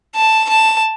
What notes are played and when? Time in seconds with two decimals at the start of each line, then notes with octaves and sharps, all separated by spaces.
0.15 A5
0.49 A5